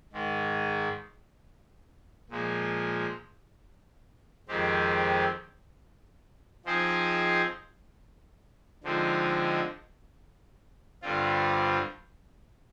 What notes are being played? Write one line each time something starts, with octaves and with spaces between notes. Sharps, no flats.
G#2 D#3 G#3
A#2 F3 G#3
F2 D#3 G#3 C4 G4
F3 C4 D#4 G#4 C5
D3 F3 G#3 C4 D#4
G2 D3 G3 C4 F4